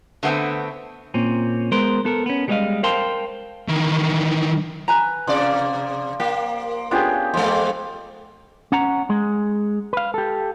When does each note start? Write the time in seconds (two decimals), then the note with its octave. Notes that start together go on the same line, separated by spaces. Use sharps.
0.23 D3 A3 B3 C4
1.14 A#2 C4 C#4
1.72 G#3 B3 A#4 C5
2.05 B3 A4 A#4
2.26 B3 C#4
2.48 G3 G#3 G4 G#4 D#5 F5
2.83 A#4 C5 F5 G5 A5 C6
3.68 D#3 E3
4.88 B4 G#5 A#5
5.27 C3 F3 D5
6.20 A#3 G4
6.91 B3 C#4 D4 F4 G4 G#4
7.34 F2 G#3 F4 G4
8.72 C#4 F#5 A#5
9.10 G#3
9.93 B4 F5
10.14 G4 A4